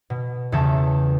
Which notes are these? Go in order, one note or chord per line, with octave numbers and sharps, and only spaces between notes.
B2
E2 C#3 C#5 E5 A5 G6